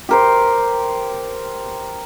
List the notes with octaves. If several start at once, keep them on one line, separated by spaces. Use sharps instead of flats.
G4 A#4 C5